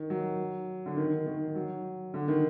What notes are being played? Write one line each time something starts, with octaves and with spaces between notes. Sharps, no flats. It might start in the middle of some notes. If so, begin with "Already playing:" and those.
Already playing: D#3
F#3
D3
D#3
D#3
F#3
D3
D#3